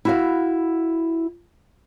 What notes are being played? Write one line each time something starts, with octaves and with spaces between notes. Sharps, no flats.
E4 F#4 F5